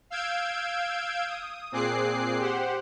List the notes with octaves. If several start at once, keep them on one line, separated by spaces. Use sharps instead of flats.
F5 E6 G6 G#6 D7
D#6
A#2 C4 G#4 D6 F#6 C7
G4 C5 F#5